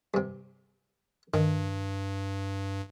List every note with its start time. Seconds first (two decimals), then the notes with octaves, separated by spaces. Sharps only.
0.14 G2 C3
1.34 G2 D#3